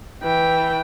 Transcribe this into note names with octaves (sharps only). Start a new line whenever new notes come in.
E3 G5